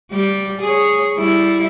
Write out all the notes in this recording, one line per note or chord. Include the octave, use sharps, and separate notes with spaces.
G3 G4
G#4 C#5
G3 E4